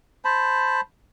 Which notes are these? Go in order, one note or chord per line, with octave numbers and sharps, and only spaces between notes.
C5 A5 B5